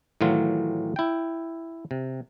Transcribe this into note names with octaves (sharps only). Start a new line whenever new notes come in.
A2 D#3 E3 F#3 F4
E4 G5
C3